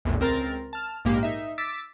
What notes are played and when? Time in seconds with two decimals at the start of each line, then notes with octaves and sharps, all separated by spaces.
0.05 A#1 E2 A2 D3
0.20 C#2 C4 A#4 A#5 A6
0.73 A5 F6
1.05 A#1 G#2 A#3 G4
1.23 D#4 E5
1.58 D6 E6 A6 B6